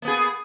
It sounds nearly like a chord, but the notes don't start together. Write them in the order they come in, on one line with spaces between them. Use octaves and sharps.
A#3 B3 G#4